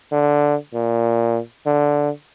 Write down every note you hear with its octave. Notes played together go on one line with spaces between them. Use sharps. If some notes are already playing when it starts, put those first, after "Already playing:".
D3
A#2
D3